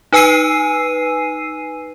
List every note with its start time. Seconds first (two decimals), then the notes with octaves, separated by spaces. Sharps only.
0.13 D#4 B4 G#5 E6 C7 D#7